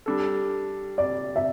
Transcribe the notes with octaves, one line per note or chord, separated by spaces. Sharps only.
G3 D4 A4
D5
E5